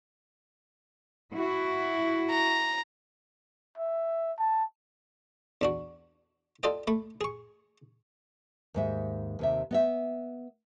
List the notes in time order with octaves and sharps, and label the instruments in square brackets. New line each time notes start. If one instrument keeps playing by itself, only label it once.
[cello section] E4 F#4
[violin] A#5
[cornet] E5
A5
[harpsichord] E2 D4 F#4
F4 A4 D5 D#5 G5
A3 B5
G#4 C#6
[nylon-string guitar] D#2 G#2 E5
D#2 C3 E5
B3 D#5 E5